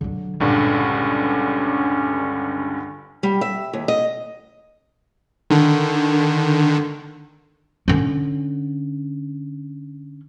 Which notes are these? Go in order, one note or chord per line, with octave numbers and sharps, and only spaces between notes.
D3 F#3
C#2 G2 A#2 D3 C#4
G3
E5
D#2
D#5
D3 D#3
D3 C#4